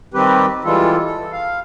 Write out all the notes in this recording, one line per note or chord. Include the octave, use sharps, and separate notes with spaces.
D#3 G3 C4 G4 B4
E3 G3 G#3 F4 A4
A4
F5